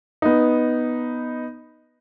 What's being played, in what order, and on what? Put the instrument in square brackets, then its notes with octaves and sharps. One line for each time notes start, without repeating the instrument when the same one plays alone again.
[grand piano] B3 D#4